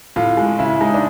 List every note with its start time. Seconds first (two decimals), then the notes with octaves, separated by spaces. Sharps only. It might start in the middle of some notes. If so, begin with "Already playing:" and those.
0.16 A2 F4
0.37 G#3
0.59 C#3 E4
0.81 G#3 D#4
0.94 D4